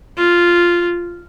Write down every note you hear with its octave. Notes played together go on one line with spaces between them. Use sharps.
F4